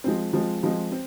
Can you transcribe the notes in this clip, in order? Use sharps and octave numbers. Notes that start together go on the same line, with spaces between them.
F3 G#3 C4
F3 G#3 C4
F3 G#3 C4
C4